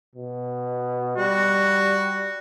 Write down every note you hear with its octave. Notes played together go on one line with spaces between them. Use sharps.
B2
G3 F#4